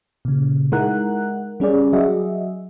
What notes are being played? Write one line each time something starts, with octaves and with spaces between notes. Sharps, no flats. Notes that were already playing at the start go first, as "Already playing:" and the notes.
A#2 C#3
G#3 D#4 E4 A#4 F#5 F#6
G3 C#4 G#4 D5
F#3 F#4 G#4 D#5 E5